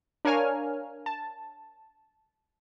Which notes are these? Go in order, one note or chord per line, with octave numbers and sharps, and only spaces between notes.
D4 A#4 C#5 F5 G#5 F6
A5